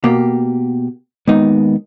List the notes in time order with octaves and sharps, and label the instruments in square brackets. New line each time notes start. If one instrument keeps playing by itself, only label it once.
[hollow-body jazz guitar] B2 A#3 G4
[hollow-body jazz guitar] D#2 D#4 [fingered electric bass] G#3 B3